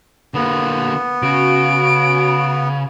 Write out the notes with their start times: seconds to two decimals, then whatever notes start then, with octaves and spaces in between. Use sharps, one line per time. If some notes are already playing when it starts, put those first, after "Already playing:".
0.34 D3 A#3 B3
1.22 C#3 F#4 D7